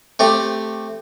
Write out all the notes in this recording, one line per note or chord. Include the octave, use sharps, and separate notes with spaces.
A3 C4 G4